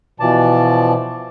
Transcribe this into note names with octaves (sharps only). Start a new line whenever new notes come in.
B2 E3 F3 D5 A5